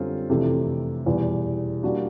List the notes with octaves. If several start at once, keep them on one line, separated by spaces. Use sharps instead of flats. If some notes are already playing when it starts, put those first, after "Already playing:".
Already playing: F#2 D3 G3 C4 F4
F2 C3 E3 A3 D4
E2 B2 G3
G3 A#3 D4 F#4